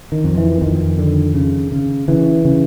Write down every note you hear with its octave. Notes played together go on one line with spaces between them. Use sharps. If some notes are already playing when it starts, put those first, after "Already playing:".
D#3
F2
E3
F2 D#3
D3
C#3
C#3
C#3 E3
C#3